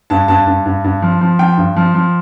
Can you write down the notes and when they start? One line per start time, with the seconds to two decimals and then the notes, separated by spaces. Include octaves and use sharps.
0.10 G2 A5
0.28 G2 A5
0.47 G2
0.66 G2
0.84 G2
1.02 F3
1.21 F3
1.39 F3 G5
1.57 G2
1.76 F3
1.94 F3